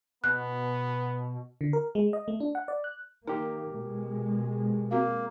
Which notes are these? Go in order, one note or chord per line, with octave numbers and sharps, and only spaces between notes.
B2 B3 F#6
D3
A#4
G#3
D#5
A3
D4
F#5
D5
F#6
D#3 A#3 D#4 G4 A#4
B2 G#3
A#3 C4 F#4 F5